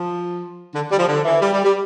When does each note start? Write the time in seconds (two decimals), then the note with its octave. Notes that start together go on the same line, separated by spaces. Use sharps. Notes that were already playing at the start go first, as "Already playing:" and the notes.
Already playing: F3
0.75 D3
0.91 G3
0.99 F3
1.08 D3
1.25 E3
1.41 G3
1.53 G3
1.64 G3